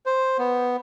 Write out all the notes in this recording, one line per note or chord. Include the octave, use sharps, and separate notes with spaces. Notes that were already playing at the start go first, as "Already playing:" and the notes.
C5
B3